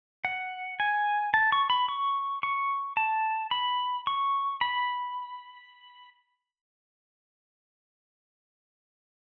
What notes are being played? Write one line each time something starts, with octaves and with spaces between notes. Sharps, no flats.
F#5
G#5
A5
C#6
B5
C#6
C#6
A5
B5
C#6
B5